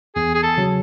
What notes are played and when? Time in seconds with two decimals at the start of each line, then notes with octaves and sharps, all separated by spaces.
0.15 E2 G#4
0.34 G#4
0.43 A4
0.57 C#3 F#3